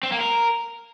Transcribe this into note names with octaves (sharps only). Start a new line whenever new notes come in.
C4
A#3
A#4